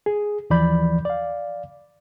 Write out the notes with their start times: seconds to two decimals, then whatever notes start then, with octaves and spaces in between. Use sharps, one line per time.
0.06 G#4
0.50 D#2 E3 F3 D5 B5 G6
1.05 D5 F5